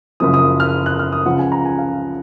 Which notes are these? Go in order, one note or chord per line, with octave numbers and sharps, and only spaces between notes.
F#1 F#2 F3 D#6
D#6
F6
F#6
F6
D#6
C#2 C#3 F3 F#5
G#5
A#5
G#5
F5